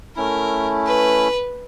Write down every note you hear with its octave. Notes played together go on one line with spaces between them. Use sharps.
A3 C#4 E4 A#4
B4